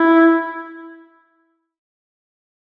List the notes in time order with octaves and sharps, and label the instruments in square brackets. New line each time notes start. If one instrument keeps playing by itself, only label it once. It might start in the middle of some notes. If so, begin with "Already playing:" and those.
Already playing: [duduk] E4